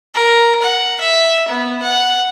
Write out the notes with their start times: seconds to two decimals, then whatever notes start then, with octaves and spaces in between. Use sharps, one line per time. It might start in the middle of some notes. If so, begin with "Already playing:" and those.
0.14 A#4
0.62 F#5
1.00 E5
1.48 B3
1.82 F#5